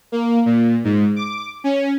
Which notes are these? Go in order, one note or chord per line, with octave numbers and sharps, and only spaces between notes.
A#3
A#2
G#2
D6
C#4